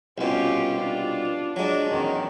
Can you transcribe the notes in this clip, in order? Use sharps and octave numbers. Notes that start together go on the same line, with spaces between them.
C2 B2 C#4 F4 G4
D4 F4
F#3 G#3 D4
E2 D#3 C#4